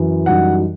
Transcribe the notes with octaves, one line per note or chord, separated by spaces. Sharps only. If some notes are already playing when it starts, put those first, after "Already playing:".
Already playing: F#2 E3
F#2 E3 G3 D#4 F#5